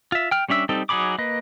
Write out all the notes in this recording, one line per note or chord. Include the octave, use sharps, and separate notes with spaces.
F4 E5
G5 F6
G3 C#4 D4 E5 E6
G3 C4 D#4 A4
F#3 D#4 G#4 B5 D6
A#3 B4 D#5